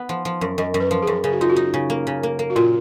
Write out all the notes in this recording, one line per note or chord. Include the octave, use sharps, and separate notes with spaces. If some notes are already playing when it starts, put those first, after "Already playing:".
Already playing: B3 F#5
F3
F3
F#2
F#2 D#5
F#2
B4
F3
F#2 G#4
C#3 G#4
F#4
D#4 F4
F#4
D#4
C#3
A#3
C#3
A#3
A#3
F#4
A#2 F4